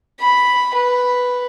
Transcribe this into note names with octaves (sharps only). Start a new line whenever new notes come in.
B5
B4